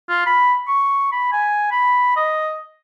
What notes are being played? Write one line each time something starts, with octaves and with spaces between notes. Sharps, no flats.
F4
B5
C#6
B5
G#5
B5
D#5